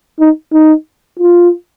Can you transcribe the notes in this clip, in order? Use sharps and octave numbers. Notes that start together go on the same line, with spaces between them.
D#4
D#4
F4